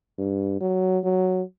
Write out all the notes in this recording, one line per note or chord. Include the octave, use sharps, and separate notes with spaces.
G2
F#3
F#3